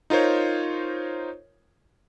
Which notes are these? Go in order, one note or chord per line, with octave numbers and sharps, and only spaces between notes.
D#4 F4 A#4 C5 C#5